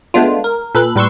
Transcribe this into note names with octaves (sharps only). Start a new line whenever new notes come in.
G#3 A3 B3 D4 F4
A#4
A#2 A4 B4 F#6
A2 G3 B4 C6 C#6 E6